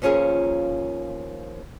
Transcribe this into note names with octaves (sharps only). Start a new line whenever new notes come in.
D#2 F3 C#4 F4 G#4 A#4